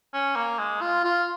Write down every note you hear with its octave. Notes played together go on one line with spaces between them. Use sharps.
C#4
A#3
G#3
F4
F4